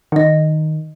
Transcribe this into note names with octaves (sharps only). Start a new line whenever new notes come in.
D#3 D#5 F#5